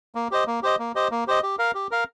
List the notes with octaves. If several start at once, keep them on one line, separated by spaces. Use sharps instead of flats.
A#3
G4 C5 D#5
A#3
G4 C5 D#5
A#3
G4 C5 D#5
A#3
G4 C5 D#5
G4
A#4 F5
G4
A#4 F5